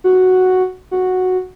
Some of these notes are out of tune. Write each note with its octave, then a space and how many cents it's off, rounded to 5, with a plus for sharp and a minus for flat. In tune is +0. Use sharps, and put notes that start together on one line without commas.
F#4 +0
F#4 -5